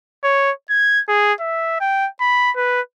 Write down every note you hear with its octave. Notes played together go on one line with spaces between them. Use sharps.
C#5
G#6
G#4
E5
G5
B5
B4